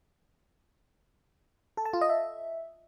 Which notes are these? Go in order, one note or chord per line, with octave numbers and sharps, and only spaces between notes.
A4
A5
F4
D#5
E5